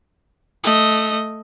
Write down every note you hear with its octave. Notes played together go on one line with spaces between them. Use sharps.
A3 D#5